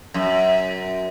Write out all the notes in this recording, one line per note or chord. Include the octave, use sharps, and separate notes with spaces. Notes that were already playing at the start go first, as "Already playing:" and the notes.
F#2